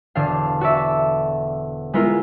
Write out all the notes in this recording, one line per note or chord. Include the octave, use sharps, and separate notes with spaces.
E1 D3 D4 F5
F#4 A4 D5 E5
G#3 B3 E4 F4 A#4